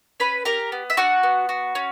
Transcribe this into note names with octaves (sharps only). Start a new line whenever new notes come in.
C#4 B4 B5
G4 A#4 A#5
B3
E5
D4 F#4 F#5
B3
F#4
C#4